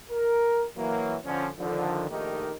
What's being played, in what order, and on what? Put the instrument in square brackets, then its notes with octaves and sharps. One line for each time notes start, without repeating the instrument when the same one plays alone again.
[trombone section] A#4
E3 F#3 A#3
D3 F3 C#4
D3 D#3 F3
A#1 D#3 A3 D#4 G4 A#4